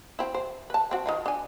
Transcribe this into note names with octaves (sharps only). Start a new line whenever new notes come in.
C4 E4
C5
B4 A5
C4 F#4
D#3 D#4 F4
D4 G#5